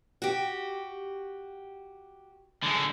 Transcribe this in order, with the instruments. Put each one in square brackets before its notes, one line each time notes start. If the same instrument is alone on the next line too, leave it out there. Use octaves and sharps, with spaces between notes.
[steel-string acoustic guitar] F#4 G4
[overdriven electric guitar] D3 G#3